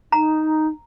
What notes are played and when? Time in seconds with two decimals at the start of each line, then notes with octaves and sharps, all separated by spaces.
0.12 D#4 A#5